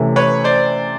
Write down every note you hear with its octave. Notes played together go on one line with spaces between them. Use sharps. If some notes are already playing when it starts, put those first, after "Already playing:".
Already playing: C3 E3 A3 C#4
B4 C#5
C5 D5